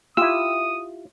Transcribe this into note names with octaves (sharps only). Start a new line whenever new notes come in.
E4 F4 G4 D#6 E6